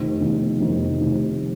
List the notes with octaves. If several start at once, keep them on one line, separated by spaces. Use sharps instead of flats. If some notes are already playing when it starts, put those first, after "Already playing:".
Already playing: F1 F2 D#3
F1 F2 D#3
F1 F2 D#3
F1 F2 D#3